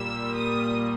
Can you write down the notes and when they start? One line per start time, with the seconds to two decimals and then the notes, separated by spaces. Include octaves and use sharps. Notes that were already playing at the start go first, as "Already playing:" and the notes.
Already playing: A#2 G3 A#3 E6
0.34 D#6